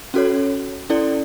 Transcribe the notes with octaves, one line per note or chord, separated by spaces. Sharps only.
C#4 F#4 A4 C#5
C#4 E4 A4 D5